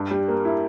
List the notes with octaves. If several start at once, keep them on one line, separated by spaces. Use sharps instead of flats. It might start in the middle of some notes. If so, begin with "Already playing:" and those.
Already playing: G2
G3
A#3
E4